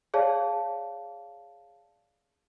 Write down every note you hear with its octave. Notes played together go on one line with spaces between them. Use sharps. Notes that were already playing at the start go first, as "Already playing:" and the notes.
G#4 C#5 D5 F5 A5